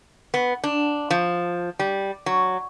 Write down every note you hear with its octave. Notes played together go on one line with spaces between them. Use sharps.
B3
D4
F3
G3
F#3